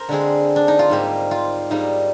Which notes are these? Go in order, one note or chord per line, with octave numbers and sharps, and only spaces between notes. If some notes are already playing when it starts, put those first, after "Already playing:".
Already playing: A#4 C5
D3 G#3 C4 G#4
D4
D#4
F4
G#2 G3 A#3 G4
F4
G#2 G3 A#3 D#4